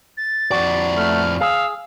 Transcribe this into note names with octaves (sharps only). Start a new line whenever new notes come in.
A6
F2 F#4 D5
A3 F6
G#4 F5 E6